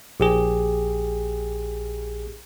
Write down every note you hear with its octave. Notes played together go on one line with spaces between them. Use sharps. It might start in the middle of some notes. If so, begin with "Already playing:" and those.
A#1 G4 G#4